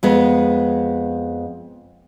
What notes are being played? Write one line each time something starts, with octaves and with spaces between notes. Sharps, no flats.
F2 G#3 B3